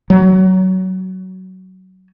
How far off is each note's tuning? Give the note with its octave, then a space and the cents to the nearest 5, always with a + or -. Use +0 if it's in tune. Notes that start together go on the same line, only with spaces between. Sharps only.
F#3 +15